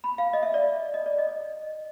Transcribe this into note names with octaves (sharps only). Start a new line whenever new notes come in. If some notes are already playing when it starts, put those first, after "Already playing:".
B5
F5
D#5
E5
D5
D#5
D5
D#5